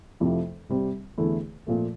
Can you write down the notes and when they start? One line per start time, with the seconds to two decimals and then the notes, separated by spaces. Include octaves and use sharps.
0.20 F2 C3 F3 A3 E4
0.69 C3 G3 C4
1.18 E2 D3 A3 E4
1.67 A#2 F3 A3